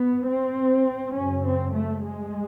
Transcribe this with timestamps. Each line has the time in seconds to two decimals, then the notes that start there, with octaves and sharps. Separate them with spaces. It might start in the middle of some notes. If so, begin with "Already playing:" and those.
Already playing: B3
0.28 C4
1.16 F#2 C#3 C#4
1.45 C4
1.74 A3
2.03 G#3